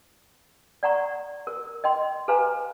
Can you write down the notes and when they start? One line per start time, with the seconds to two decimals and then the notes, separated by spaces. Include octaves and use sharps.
0.83 D5 F#5 A#5 C#6
1.47 A#4
1.84 D#5 G5 C6
2.28 A4 B4 C5 F5 G#5 A#5